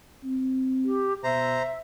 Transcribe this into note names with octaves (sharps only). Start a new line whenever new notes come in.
C4
G4
B2 C5 E5 A#5